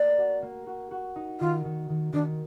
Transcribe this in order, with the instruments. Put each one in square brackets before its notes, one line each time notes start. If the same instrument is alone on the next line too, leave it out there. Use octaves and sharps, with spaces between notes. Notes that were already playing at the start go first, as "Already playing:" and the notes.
Already playing: [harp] A#3 [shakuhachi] D5
[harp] F#4
A#3
F#4
F#4
D#4
[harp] D#3 [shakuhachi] F4
[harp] D#3
D#3
[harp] D#3 [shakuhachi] D4